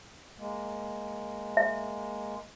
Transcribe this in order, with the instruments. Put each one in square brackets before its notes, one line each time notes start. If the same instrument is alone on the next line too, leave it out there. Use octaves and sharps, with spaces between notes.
[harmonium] G#3 A#3
[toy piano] E5